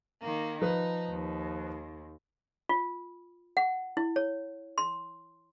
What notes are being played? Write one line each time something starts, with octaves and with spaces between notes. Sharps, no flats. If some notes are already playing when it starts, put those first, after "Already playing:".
D#3 A#3
F3 D#4 B4
D#2
F4
F#5
E4
C#5
C6